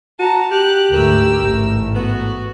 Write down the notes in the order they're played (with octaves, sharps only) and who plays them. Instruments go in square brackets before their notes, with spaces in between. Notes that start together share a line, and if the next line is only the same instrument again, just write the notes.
[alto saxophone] F#4 [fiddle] A5 A#5
[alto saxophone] G4 [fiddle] F#6
[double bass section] D2 G#2 A3 [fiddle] A#4 E6
[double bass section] A1 G#2 A3
[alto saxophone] B3 [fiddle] F#4